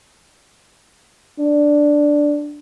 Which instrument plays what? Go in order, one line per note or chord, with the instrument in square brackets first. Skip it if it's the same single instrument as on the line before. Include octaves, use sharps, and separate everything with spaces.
[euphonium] D4